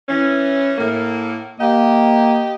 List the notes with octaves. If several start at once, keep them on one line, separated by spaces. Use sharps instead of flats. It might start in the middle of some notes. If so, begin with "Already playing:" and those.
E3 C#4
A2 A#3
A#3 G4 D#5